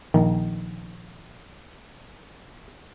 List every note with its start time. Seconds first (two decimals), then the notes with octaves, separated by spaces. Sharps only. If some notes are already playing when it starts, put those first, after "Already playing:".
0.14 A#1 D#3